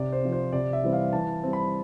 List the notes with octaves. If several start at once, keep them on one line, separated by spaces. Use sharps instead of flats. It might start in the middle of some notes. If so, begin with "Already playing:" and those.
Already playing: C3 D5
C5
F3 C4
C5
C3 D5
E5
E3 G3 C4
F5
E3 A5
G3 C4
B5